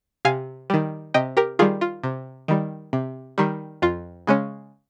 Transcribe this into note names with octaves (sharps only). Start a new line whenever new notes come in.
C3 F5 G#5
D#3 G3
C3 D#5 G5
G4 A#4
D#3 G3 F4 G#4
F4
C3
D#3 G3
C3
D#3 G3
F2 F4
C#3 G#3 C#4